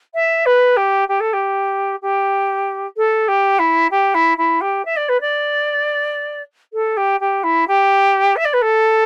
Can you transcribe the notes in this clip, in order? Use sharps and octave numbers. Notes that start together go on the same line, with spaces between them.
E5
B4
G4
G4
A4
G4
G4
A4
G4
E4
G4
E4
E4
G4
E5
D5
B4
D5
A4
G4
G4
E4
G4
E5
D5
B4
A4